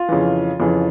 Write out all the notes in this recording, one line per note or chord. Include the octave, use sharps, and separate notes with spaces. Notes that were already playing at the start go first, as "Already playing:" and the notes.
Already playing: F4
F2 C#3 E3
F2 C#3 E3